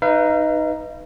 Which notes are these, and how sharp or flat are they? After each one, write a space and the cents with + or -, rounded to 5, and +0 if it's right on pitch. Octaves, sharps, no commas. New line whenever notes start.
D#4 +0 B4 +0 F5 -40